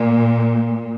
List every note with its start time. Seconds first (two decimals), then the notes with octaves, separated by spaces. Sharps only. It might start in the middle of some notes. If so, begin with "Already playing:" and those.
Already playing: A#2